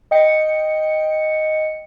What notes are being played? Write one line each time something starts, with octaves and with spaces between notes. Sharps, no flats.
D#5 G5 C#7